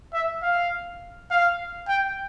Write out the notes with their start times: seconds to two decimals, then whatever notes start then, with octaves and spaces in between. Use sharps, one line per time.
0.13 E5
0.42 F5
1.31 F5
1.88 G5